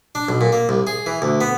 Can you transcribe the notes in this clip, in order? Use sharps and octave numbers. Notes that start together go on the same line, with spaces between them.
D4
B1
A#2
A#3
C2
G#4
E3
D2
B3